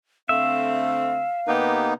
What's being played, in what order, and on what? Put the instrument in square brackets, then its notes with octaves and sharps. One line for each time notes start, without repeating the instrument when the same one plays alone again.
[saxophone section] D3 A3 C4 [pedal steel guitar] E5 [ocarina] F5
[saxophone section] C3 G4 B4 [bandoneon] A#3 B3 D#4